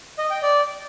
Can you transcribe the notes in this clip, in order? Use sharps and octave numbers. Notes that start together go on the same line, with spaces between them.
D#5
G5
D5